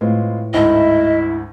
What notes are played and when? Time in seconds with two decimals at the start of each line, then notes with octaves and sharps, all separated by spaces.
0.01 A2 G#3 C4 F4 B4
0.54 D2 G#2 A3 E4 D#5